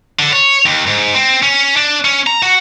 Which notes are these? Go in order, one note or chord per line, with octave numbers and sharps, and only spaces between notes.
D3
C#5
D#2
G#2
C4
C#4
D4
C#4
A#5
F#4